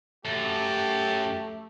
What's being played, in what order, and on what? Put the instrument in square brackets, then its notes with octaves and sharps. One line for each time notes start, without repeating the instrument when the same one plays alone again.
[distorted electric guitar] F#2 [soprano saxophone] A3 [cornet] G4 [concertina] A5